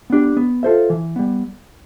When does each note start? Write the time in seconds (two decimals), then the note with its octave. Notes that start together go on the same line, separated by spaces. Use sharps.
0.10 B3 D4 G4
0.37 B3
0.63 F4 A4 C5 E5
0.90 E3
1.16 G3 B3